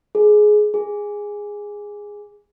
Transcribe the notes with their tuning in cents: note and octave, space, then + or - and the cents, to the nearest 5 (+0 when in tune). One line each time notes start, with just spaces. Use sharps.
G#4 +15
G#4 -10